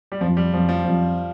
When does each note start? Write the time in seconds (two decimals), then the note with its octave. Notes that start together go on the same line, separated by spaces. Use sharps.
0.12 G3
0.21 F2 F3
0.37 G3
0.53 F2 F3
0.69 F3
0.85 F2